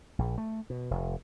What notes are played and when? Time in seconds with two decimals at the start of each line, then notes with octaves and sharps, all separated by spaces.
0.19 A#1
0.38 A3
0.70 B2
0.91 F1